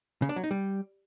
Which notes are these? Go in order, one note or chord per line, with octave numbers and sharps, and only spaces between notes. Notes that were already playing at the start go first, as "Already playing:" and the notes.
C#3
D4
F#3
D#4
G3